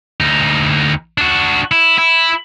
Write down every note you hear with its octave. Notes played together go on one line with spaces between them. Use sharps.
D2 D#4
D4 F#4
E4
E4